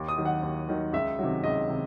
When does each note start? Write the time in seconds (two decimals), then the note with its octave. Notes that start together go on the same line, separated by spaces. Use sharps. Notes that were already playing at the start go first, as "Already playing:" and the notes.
Already playing: D#2
0.08 D#6
0.18 D#3 F#3
0.25 F#5
0.43 D#2
0.69 D#3 F#3
0.93 C#2 E5
1.19 C3 D#3 F#3
1.44 C#2 D#5
1.69 C3 D#3